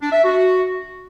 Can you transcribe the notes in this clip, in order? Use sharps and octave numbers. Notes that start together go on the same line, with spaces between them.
D4
E5
F#4